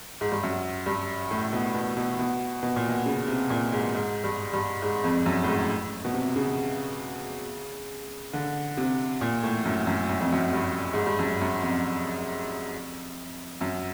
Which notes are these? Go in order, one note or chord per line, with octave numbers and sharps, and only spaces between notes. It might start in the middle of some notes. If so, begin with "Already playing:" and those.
G#2
G2
F#2
G2
A2
B2
B2
B2
B2
B2
A#2
B2
C#3
C3
A#2
G#2
G#2
G2
G2
G#2
F2
F#2
A2
G#2
B2
C3
C#3
D3
C3
A#2
A2
F#2
F#2
F#2
F2
F#2
G2
G#2
G2
F#2
F#2
F2
F#2